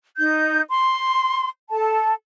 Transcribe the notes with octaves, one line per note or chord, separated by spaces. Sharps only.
D#4 G6
C6
A4 A5